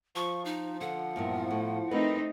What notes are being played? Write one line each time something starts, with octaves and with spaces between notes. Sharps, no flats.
F3 C#6
D#4
D3 F#5
E2 G2 A#2
A2
A3 C4 D#4 A#4 B4